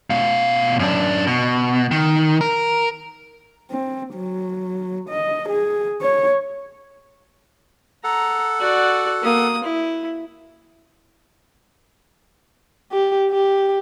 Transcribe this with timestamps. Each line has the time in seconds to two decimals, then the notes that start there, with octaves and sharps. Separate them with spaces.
0.10 B2 F5
0.79 F#2 D4
1.27 B2
1.91 D#3
2.41 A#4
3.71 C4
4.15 F#3
5.09 D#5
5.49 G#4
6.02 C#5
8.04 A4 F#5 A#5
8.60 F#4 D5
9.22 A#3 D#6
9.64 E4
12.92 G4
13.31 G4